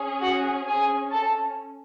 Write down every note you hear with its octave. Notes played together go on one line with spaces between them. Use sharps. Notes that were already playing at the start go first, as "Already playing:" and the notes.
Already playing: C#4 G#4
F#4 F#5
G#4 G#5
A4 A5